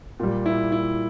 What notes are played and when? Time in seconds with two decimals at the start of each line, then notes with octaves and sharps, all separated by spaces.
0.20 A#2 G3
0.46 E4
0.72 E4